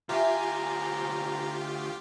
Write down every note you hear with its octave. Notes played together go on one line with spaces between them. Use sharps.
D2 F4 G4 E5 G#5 A#5